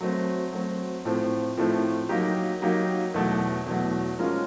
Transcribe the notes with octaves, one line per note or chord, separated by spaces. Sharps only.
F#3 A3 C4
F#3 A3 C4
A2 F3 A3 C4
A2 F3 A3 C4
F#3 A#3 D#4 G4
F#3 A#3 D#4 G4
E2 B2 F#3 A3
E2 B2 F#3 A3
F3 G#3 C#4 F4 A#4